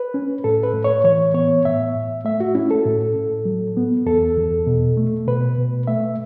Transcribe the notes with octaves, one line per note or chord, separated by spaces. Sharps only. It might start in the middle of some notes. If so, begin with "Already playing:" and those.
Already playing: B4
C#4
A2 A4
B4
A2
C#5
E3 C#5
B3 C#5
A2 E5
A2
A3 E5
F#4
C#4 E4
A4
A2
A2
F#3
B3
E2 A4
E2
B2
A3
B2 B4
B2
A3 E5